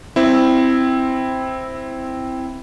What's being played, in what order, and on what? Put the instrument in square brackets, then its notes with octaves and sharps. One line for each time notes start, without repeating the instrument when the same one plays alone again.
[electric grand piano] C4 E4